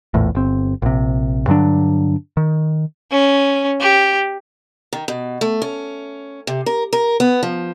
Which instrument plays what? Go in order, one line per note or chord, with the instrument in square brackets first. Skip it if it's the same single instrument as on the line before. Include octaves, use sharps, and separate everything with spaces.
[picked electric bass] A#1 E2 A2
G1 C4
A#1 C3
G2 D3 F#3 D4
D#3
[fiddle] C#4
G4
[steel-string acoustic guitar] D#3
B2
A3
C#4
C3
A#4
A#4
B3
F3